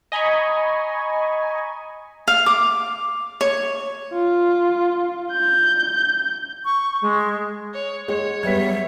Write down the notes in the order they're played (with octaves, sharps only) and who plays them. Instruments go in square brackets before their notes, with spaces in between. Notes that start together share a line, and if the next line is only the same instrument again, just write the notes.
[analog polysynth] D#5 G#5 A#5 B5 C#6
[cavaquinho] F5
D6
C#5
[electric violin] F4
G6
[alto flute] C#6
G#3
[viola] C#5
[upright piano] G#3 [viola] C#5 [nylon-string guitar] F#5
[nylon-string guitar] F#3 G3 B3 [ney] E5 [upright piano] G#6 B6